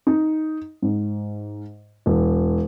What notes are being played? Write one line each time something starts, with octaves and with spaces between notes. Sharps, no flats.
D#4
G#2
E1